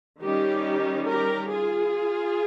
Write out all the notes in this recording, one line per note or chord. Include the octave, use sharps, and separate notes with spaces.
D#3 G3 C#4 D#4 G4
G4 A#4
F4 G#4